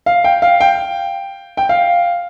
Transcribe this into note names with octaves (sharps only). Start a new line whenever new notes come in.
F5
G5
F5
G5
G5
F5